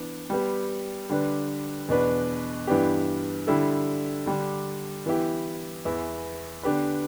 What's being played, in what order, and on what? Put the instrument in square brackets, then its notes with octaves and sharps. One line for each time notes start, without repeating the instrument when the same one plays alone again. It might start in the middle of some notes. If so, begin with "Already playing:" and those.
Already playing: [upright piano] E3 B3 D4
G3 B3 G4
D3 G3 D4 B4
E2 B2 B3 D4 B4
G2 E3 B3 D4 G4
D3 G3 E4 A4
D3 G3 D4
E3 B3 E4 G4
E2 E3 B3 E4
D3 B3 D4 G4 B4